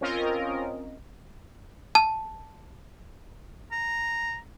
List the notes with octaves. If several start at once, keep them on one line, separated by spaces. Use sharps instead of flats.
C4 C#4 F4 A#4 D#5
A5
A#5